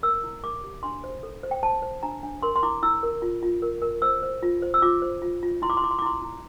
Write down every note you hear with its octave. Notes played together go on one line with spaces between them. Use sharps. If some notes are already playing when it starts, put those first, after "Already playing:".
A#4 E6
E4
A#4 D6
G4
D4 C6
C5
A4
C5
G5
C5 A5
C5
D4 A#5
D4
A#4 C6
C6
E4 D6
E4 E6
A#4
F4
F4
A#4
A#4
C5 E6
C5
F4
C5
E6
F4 D6
C5
F4
F4
E4 C6
D6
C6
E4 D6
C6
D6
E4 C6
E4